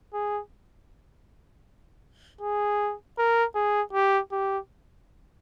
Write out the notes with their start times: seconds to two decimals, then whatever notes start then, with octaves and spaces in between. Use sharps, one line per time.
0.14 G#4
2.41 G#4
3.18 A#4
3.55 G#4
3.93 G4
4.32 G4